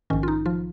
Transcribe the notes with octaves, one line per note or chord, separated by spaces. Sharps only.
A#1 G#2 D#3 C#4
F4
D#4
F3 F4